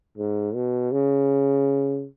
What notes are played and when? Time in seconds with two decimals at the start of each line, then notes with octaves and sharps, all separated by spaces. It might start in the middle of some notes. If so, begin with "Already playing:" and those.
0.18 G#2
0.54 B2
0.92 C#3